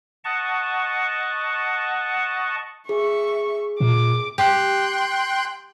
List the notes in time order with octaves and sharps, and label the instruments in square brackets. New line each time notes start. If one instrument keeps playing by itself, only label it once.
[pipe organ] D#5 F#5 A5 C#6
[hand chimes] G#4 [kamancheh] E5 C#6
[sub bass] A#2 [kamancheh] D6
[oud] G4 [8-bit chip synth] G5 C6 F#6